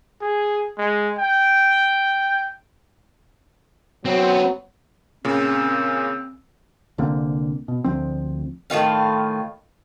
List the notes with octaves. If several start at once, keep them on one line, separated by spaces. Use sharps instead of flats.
G#4
G#3
G5
F#3 B3 C4
A#2 C#3 C4
C2 D3 A#3 C4
B2
D2 F3 C4
A2 D#3 F4 F5